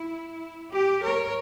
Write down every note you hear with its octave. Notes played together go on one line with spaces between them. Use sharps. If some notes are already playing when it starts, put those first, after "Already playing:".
Already playing: E4
G4
A#4 C#5